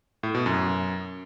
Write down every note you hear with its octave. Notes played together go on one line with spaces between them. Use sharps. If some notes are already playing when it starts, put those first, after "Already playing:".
A2
B2
F#2